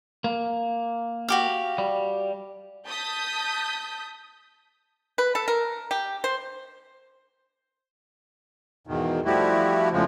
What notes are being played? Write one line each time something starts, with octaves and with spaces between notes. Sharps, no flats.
A#3
F#4 G4 F5
G3
A5 D#6 G6 B6
B4
A4
A#4
G4
C5
E2 G#2 B2 D#3
F3 G3 A3 E4 F#4 G4
E2 A2 C#3 F3 G#3 C4